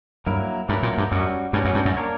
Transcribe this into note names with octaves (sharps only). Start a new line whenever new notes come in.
G2 F#3 A#3 E4 A#4
G2 F#3 A#3 E4 A#4
A#2
G2
F#2 G3 C#4 F#4
G2 G3 C#4 F#4
F#2
G2
F#2
A#3 D4 A#4 C#5